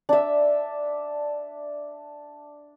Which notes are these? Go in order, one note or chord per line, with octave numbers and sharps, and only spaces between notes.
D4 E5